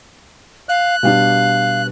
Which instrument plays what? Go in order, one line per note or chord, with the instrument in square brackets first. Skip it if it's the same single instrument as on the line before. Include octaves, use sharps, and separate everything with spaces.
[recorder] F5 [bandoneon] F#6
[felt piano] B2 G3 D4 [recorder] F5